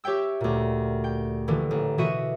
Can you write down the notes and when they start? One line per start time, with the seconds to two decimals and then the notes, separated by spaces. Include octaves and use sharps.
0.04 G4 C#5 E5 G5 E6
0.41 D2 A#2
1.04 G5
1.48 A#1 D3 E3
1.71 A1
1.98 B2 E3 F#4 E5 C#7 D#7